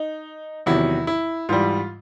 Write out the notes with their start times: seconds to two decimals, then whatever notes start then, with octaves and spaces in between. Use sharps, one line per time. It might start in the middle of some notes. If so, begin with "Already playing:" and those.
Already playing: D#4
0.66 E2 C3 D#3 F#3 E4
1.07 E4
1.49 G#2 E3 G3 F4